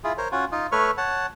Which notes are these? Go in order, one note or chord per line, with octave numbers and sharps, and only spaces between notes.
E4 F4 G#4
A#4 C5 C#5
C#4 F4 F#4
D#4 F4
A3 B4 C#5 C#6 F6
C#5 F#5 A5